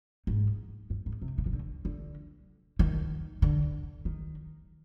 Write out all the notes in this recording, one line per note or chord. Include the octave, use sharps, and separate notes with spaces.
G#2
G2
G#2
C3
C#3
D#3
D3
D3
D#3
D3
D#3